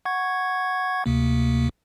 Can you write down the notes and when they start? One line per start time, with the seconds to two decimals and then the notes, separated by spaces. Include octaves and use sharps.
0.05 F#5 C#6 G#6
1.06 D2 C3 A#3